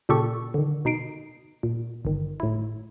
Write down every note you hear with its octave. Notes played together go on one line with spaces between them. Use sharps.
A#2 C#3 G4 A4 C#6
D3 D#3
B2 D#4 C7 D7
A#2
G1 D#3
A2 E4